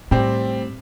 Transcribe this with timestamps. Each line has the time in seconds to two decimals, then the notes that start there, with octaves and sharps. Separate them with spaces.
0.11 A2 G3 C4